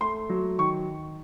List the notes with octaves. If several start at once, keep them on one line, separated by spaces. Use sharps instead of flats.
A3 C6
F#3
D#3 C#6